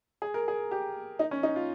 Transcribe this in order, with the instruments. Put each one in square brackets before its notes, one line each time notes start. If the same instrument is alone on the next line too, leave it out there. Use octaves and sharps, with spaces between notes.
[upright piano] G#4
A#4
G#4
G4
D#4
C#4
D#4
F4